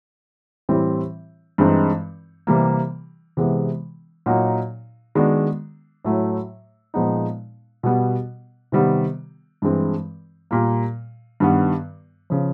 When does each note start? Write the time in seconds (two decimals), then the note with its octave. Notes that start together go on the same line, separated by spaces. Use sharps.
0.69 A2 E3 G3 C4 E4
1.58 G2 E3 G#3 C4 D#4
2.47 C3 E3 G3 A#3
3.37 C3 E3 G#3 B3
4.26 A#2 F#3 A#3 D#4 F#4
5.15 D#3 G#3 B3 D4 F#4
6.05 A2 F#3 A3
6.94 A#2 F3 G#3 B3 D#4
7.83 B2 G3 B3
8.72 C3 D#3 G3 B3
9.62 G2 E3 G#3 C4
10.51 A#2 G3 A#3
11.40 G2 D#3 G3 B3
12.30 C#3 F3